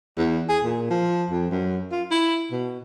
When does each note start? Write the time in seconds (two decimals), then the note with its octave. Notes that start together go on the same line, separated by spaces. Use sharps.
0.17 E2
0.49 G#4
0.64 A#2
0.90 F3
1.30 F2
1.51 F#2
1.92 F4
2.11 E4
2.51 B2